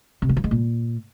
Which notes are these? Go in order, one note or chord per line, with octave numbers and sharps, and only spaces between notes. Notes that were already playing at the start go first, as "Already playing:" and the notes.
C3
E3
F3
G#3
A#2